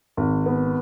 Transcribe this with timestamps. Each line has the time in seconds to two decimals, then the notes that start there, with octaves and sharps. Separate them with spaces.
0.17 G#1
0.46 B3